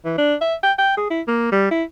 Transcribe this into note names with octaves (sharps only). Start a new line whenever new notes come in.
E3
D4
E5
G5
G5
G#4
E4
A#3
G3
E4